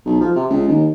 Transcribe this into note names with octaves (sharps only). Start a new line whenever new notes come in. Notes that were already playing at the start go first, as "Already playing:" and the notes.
B1
F3
C3
C#2
D#2